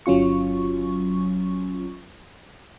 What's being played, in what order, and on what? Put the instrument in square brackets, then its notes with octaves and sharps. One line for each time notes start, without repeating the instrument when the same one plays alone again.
[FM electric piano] G1 F#3 C#4 F4 C#6